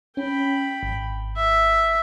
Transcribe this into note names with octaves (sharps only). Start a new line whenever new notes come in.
C#4 G5 B5
G#1
E5